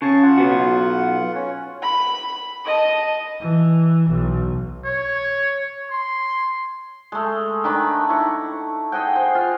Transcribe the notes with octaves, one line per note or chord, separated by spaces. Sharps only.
C#3 C#5 A5 C#6
F4 F#5
B1 B3 F#4
C#4 C#5
B5
D#5 A5
E3
B1
C#5
C6
G#3 A3
D#3 D4 B5
E4 C#6
G#4 D#5 F#5 G5
C5
F4